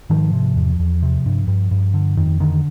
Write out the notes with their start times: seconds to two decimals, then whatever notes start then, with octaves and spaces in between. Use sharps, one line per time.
0.10 G#2 D#3 F3
0.33 C3
0.56 E2
0.79 E2
1.02 C3
1.26 G2
1.48 G2
1.71 G2
1.94 D3
2.17 F2 D#3
2.40 D3 D#3